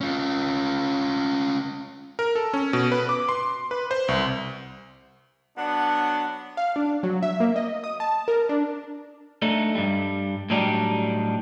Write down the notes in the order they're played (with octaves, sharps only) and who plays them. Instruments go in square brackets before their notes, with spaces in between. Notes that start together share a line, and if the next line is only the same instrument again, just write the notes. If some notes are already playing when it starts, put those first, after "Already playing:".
[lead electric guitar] C#4 F4
[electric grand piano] A#4
A4
C#4
B2
B4
D6
C6
B4
C5
C2
[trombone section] F#3 B3 D4 [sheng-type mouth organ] F#5
[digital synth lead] F5
D4
F#3
E5
A#3
D#5
D#6
A5
A#4
D4
[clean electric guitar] A3 D4 D#4
G2 G3
A2 F#3 G3 D4 D#4 G4